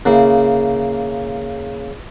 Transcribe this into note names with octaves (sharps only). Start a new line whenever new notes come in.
C#3 A#3 E4